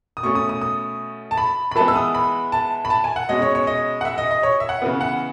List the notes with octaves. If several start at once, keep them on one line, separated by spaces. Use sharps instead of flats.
D#6
B2 A3 C#4 C#6
D#6
D#6
D#6
A5
B5
B5
E3 G#3 B3 A5
E6
D#6
B5
A5
B5
A5
G#5
F#5
B2 G#3 C#4 D#5
C#5
C#5
D#5
F#5
E5
D#5
D#5
C#5
E5
F#5
C#3 E3 B3
F#5